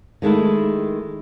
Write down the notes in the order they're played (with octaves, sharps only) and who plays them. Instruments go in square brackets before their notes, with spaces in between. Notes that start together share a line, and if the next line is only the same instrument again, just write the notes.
[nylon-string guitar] D#3 G#3 A3 E4